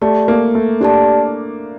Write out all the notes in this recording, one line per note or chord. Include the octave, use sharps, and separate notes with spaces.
A3 G4 D5 A5
A#3
A3
D4 G4 D5 A5